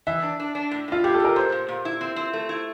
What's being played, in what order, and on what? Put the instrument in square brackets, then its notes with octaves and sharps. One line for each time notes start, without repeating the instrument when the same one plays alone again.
[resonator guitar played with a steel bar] E3 [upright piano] E5
[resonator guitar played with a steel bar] D4
D4
D4
A2
[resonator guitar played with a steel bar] A2 [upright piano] F4
[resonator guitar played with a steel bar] A2 [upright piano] G4
[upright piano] A4
[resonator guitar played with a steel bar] A2 [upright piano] A#4
[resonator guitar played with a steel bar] A#2 [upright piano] C5
[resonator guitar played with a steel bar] A#2
A#2
E4
C4
C4
A3
E4